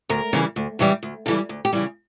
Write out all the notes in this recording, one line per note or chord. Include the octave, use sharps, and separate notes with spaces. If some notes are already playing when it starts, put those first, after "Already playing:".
D2 A#4
C#3 E3 G3
D2
C#3 E3 G3
D2
C#3 E3 G3 A4
D2
G4
C#3 E3 G3